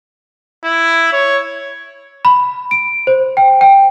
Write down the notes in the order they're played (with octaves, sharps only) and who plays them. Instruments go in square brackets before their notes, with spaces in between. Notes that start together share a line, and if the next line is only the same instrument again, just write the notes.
[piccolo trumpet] E4
C#5
[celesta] B5
D7
C5
G5
G5